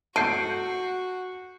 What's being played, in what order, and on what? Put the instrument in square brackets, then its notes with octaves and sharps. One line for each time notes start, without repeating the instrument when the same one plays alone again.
[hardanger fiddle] F#4 [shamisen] A4 [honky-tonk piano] G6 C7 D7